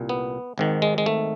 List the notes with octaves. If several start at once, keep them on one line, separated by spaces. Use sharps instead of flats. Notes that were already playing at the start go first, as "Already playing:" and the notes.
Already playing: C2 A#2
B3
G#1 G#2 D#3
G#3
G#3
A3